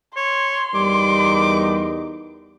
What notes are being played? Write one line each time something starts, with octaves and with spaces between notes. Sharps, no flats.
C#5 C6
E2 G3 D#4 A#4 D6